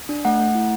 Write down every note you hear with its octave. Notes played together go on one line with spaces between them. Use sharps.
D4
A3 F#5
A3
E4